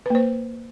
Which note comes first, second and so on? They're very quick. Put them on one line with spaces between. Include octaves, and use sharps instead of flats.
B4 A#3 C5